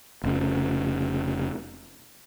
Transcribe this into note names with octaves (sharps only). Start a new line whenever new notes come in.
F1 C#3